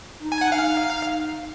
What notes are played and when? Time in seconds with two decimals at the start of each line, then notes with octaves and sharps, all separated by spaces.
0.22 D#4
0.32 G#5
0.41 F#5
0.52 D#4 F5